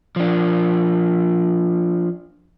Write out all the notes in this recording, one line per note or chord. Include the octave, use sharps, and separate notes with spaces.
F3 D4